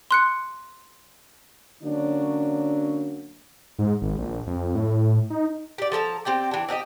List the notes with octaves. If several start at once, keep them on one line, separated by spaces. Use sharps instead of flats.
C6 F#6 C#7
D3 F#3 A#3 C#4 D4
G#2
G#1
A#1
F2
A2
D#4
G4 D5
F3 A4 A5 A#5
C4 G4 D5 G5
E3 D4
C4 D4 G4 D#5